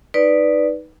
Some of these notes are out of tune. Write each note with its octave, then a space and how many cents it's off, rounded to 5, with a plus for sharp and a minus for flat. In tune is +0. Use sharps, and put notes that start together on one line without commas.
D#4 +0 B4 +0 D5 +0